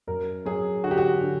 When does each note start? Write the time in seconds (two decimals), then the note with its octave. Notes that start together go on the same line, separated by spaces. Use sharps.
0.07 F#2 A#4
0.45 F#3 G#4
0.83 D3 F#4
0.91 G4
0.98 F#4
1.21 D3